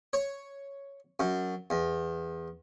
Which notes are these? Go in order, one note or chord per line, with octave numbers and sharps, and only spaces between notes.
C#5
F#2
E2